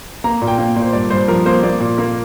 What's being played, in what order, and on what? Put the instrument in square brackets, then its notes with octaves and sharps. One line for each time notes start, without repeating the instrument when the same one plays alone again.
[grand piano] A#3 A#5
A#2
G5
A#3
A#2
C5
G2 D5
G2 C5
F3 A#4
A#3 C5
A#3 D5
A#2
A#3 A#4